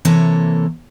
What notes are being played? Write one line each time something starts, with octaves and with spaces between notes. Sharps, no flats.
C3 E3 A#3 A4 C#5